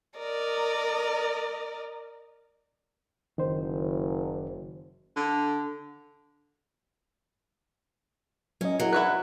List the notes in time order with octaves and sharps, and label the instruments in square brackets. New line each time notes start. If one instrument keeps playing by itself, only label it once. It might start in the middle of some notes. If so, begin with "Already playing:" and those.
[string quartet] A#4 D5 D#5
[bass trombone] F#1 [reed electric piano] D#3 C5
[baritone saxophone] D3
[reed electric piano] F#3 D#5 [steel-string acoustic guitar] C#4
[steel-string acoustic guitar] F#3 [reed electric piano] E4 G#4 A#4
[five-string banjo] E4 F#4 B4 [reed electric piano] F#6